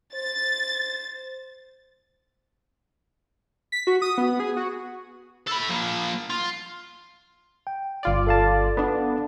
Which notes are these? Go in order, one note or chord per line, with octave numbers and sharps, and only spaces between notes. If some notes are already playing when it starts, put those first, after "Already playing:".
C5 A6
B6
F#4
D#6
B3
G#4
F#4
A4 B5
F3 A#3
F4
G5
G1 F4 D5
A4 F5 A5
B3 D4